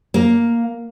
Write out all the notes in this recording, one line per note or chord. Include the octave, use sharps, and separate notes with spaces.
A#3